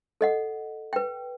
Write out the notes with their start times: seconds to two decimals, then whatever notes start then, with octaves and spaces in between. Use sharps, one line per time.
0.21 A4 D#5 F#5
0.93 B4 G5